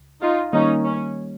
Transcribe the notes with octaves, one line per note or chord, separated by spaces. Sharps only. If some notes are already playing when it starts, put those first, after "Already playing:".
Already playing: C#2
D#4 F4
D#3 G3 A#3 C#4 D#4
C#4